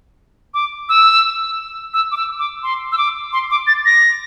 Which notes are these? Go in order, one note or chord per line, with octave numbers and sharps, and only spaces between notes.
D6
E6
E6
D6
E6
D6
C6
E6
D6
C6
D6
A6
A#6